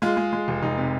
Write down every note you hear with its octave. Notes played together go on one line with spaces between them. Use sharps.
G#3 F4
G#3
G#3
F1
F1 D#4
C3